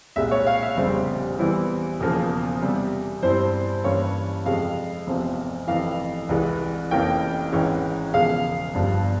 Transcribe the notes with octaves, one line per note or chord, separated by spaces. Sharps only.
C2 A#2 G#3 E5
C#5
F5
E5
F1 E2 C#3 G3 C4
E2 E3 G3 C4 E4
E1 E2 C#3 F3 A#3
E2 C3 G3
G2 G3 C4 E4 C5
G2 E3 A#3 C#4 E4 C#5
F2 C3 F3 G#3 F5
F1 E2 C3 F3 C4
F1 F2 E3 F5
C2 C3 E3 G#3
F1 F2 E3 A#3 C#4 G5
G#1 G#2 E3 G#3 C#4
E1 E2 C#3 F3 G#3 F5
G1 G2 F3